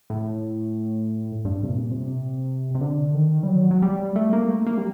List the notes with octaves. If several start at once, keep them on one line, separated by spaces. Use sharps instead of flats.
A2
G2
C3
A#2
C3
C3
D3
D#3
G3
F#3
F#3
G3
A3
A#3
A3
A#3
G3